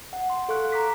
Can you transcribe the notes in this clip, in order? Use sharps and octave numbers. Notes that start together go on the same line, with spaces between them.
F#5
C6
A4 F5 C#6 F#6
A#5 D6 B6